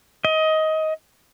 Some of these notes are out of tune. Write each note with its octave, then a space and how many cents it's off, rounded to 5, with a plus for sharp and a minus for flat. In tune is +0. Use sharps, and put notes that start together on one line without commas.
D#5 +20